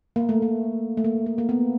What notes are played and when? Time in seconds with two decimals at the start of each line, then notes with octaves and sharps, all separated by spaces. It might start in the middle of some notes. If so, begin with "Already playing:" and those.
0.16 A#3
0.29 A3
0.42 A#3
0.97 A3
1.04 A#3
1.26 A3
1.38 A#3
1.49 B3